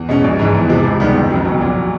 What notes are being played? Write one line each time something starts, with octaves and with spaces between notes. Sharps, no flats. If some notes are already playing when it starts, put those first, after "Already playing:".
Already playing: E2
B2 G#3 C#4
A#1
G#2 E3
E2
C3 F3 G#3
C#2
C3 D#3 G3 B3
F#1
F2 C#3 F#3
B1
A#2 F#3